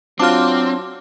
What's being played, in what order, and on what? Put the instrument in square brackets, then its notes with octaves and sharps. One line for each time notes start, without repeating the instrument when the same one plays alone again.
[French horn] F#3 [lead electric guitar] C4 [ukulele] D4 F4 [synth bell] D6 F6